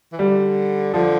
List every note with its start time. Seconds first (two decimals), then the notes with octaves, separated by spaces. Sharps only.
0.13 E3
0.19 D3 G3
0.94 D3 F3